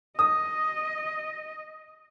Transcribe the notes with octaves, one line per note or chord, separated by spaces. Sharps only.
D#5 D#6